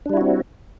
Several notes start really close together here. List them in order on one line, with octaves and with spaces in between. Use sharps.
D4 G3 E4 F#4 C4